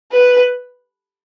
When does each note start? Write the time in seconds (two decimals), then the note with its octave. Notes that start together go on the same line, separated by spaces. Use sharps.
0.12 B4